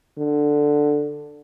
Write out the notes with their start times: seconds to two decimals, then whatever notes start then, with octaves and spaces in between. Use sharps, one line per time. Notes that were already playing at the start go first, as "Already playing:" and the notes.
0.18 D3